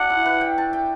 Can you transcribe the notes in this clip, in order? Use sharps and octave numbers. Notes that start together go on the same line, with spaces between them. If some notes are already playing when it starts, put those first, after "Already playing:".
Already playing: D4 F#4 F#5
E4
B4
G5
A5
G5